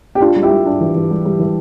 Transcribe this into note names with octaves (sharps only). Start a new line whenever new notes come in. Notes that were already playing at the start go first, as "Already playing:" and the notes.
G4
D4 F4
G3
E4 G4
G3
D4
E3
E3
G3
G3
E3